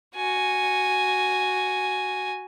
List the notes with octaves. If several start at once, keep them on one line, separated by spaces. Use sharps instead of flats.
F#4 G#5